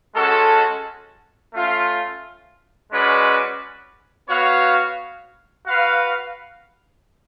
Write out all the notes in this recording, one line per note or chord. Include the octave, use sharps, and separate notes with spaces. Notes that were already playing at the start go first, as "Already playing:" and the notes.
G#3 C#4 F#4 A4
A3 C#4 F4
G#3 C#4 F#4 B4 D5
B3 F#4 C#5 F5
F#4 B4 F5